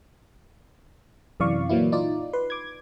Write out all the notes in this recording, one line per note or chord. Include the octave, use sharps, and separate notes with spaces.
F#2 C3 E3 D5 F5 C#6
A#2 E3 F#3 A#3 E4
D#4 F4 D5
B4 C6
D6 G#6